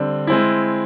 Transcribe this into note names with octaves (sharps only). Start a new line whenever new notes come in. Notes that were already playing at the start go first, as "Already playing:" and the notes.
Already playing: D3 G3 C4
G#3 C4 E4